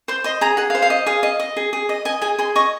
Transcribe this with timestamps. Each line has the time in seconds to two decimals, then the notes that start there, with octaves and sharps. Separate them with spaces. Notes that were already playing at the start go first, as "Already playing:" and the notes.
0.08 C5 C6
0.24 D#5 C6
0.41 G#4 A#5
0.57 G#4 F#5
0.70 F5
0.75 C5
0.82 F5
0.90 D#5
1.06 G#4 F5
1.23 D#5
1.40 D#5
1.57 G#4
1.73 G#4
1.89 D#5
2.05 D#5 G#5
2.22 G#4 G#5
2.38 G#4 C6
2.56 D#5 C#6